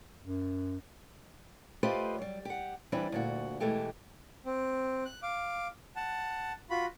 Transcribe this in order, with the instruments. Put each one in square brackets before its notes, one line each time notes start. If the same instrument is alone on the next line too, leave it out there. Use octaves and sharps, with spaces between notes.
[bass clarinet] F#2
[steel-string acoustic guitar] A3 F4 G4 B4 C5 D#5
F#3 G3
G4 F#5
E3 G3 C4 D4 B4
D2 A#2 F#4
B2 E3 G#3 A3 G4
[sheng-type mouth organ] C4
F#6
F5 D6
F#5 A5
F4 F#4 B5